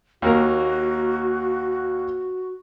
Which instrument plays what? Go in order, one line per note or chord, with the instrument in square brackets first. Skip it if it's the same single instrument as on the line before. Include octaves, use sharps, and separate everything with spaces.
[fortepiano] D#2 A#3 A#4 [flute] F#4